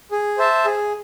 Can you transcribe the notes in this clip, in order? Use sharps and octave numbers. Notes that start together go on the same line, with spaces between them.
G#4
C5 E5 A5
G#4